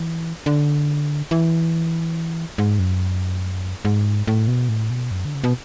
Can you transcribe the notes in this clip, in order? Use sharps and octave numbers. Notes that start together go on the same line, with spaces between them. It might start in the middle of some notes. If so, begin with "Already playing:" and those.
Already playing: E3
D3
E3
G#2
F#2
G#2
A2
B2
A2
B2
F#2
D3
C#3
B2